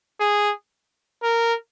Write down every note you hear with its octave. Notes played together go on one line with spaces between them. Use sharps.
G#4
A#4